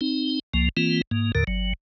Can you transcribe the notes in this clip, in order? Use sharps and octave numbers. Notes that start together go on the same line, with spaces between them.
C4 D#4
C#2 F3 A#3
E3 A#3 C4 F4
G#2 A#3
D#2 A2 D3 A#4
G1 F#3